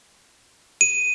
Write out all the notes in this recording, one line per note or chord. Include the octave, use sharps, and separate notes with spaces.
D#7